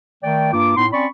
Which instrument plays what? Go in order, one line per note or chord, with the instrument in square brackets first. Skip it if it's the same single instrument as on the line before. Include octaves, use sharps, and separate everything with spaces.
[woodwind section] D#3 A3 D5 G5
G2 A#3 F4 D6
A2 B3 D#4 C6
C4 C#4 D5 B5 C#6